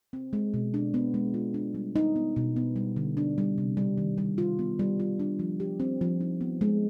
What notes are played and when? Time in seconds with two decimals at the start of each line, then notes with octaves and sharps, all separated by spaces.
0.13 C4
0.33 G#3
0.54 B2
0.74 D4
0.94 B3
1.14 G#3
1.34 F4
1.54 D4
1.74 G3
1.96 D#4
2.16 B3
2.36 B2
2.56 B3
2.76 G3
2.96 D3
3.17 D4
3.38 G3
3.58 C3
3.77 G3
3.97 D#3
4.18 G3
4.38 F4
4.59 B3
4.79 G3
5.00 F4
5.19 D4
5.39 F3
5.60 G4
5.80 C4
6.01 F3
6.21 D#4
6.41 B3
6.61 G#3